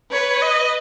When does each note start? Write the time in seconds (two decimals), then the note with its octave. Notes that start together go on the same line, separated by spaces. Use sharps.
0.13 B4 C#5
0.42 D#5